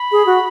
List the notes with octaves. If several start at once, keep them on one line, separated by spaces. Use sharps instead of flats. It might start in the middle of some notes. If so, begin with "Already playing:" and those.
Already playing: B5
G#4
F#4